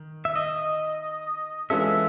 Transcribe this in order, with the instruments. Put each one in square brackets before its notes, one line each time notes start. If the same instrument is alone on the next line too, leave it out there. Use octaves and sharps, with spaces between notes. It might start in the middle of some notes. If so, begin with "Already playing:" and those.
Already playing: [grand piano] D#3
[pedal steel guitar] E5
D#5
[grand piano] E3 G#3 C#4 F4 A4 [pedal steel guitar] E5